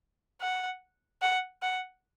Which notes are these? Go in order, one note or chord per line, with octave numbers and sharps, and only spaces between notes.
F#5
F#5
F#5